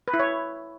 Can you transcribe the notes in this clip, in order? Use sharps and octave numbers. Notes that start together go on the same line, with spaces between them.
B4
E4
C#5